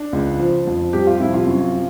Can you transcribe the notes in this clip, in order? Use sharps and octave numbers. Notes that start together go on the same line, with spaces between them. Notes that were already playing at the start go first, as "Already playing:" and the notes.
Already playing: D4
C#2
F3
F2
G3 G4
F4
C3 E4
F4
F#2